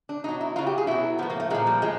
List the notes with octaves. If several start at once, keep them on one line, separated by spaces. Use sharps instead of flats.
D4
B2 F#3 D#4
E4
C#3 F#3 F4
G4
G#4
B2 F#3 E4
A2 F3 B3
A#3
A3
A#2 F3 G#3
G3
A2 G#3